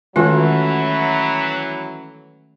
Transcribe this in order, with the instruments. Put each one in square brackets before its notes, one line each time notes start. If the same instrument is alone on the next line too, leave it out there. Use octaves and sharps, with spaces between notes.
[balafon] D#3 G#3 F4 [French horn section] E3 F#3 [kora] A3 C#4 F#4